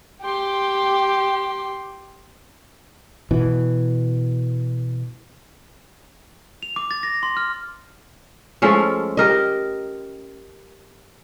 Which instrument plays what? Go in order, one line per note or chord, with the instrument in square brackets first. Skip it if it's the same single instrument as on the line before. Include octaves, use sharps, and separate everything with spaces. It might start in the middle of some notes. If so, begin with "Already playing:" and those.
[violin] G4 [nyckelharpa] G5 C6
[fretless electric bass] B2 E3
[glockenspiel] F7
D6
A6
A#6
C6
F6
[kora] F3 G#3 A3 C#4
G4 A#4 D#5